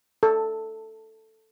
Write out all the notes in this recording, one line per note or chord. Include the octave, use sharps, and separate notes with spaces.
A4